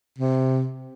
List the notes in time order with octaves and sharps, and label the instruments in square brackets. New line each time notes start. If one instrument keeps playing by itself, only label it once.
[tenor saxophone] C3